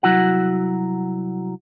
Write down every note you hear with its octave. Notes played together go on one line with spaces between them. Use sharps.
C2 F#3 E4 F#4 F#5